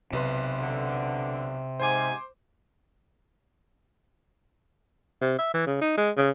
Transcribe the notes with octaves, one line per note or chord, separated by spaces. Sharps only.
B1 C3 B4 C6
D3
G#2 C5 G#5 C6 D6
C3
E5
E3
C#3
D#4
G#3
C#3